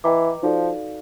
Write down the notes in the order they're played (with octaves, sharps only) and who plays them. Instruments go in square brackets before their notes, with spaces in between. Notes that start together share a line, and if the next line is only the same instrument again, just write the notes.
[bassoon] E3 [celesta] B4 D#5 G5 A#5 D6
[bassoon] F3 [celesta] D#4 F#4 A4 D5 F5